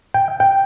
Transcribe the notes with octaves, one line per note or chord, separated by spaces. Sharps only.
G5
G5